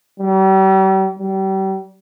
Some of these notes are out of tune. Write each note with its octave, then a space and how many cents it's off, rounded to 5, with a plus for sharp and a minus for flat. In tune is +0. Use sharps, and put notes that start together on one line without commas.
G3 -40
G3 -35